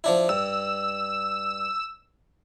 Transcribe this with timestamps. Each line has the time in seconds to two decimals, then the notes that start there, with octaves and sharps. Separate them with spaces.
0.04 F3 D4 E4
0.29 G2 E6